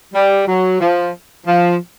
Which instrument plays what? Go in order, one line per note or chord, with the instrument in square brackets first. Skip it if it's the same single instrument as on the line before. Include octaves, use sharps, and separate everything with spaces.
[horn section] G3
F#3
F3
F3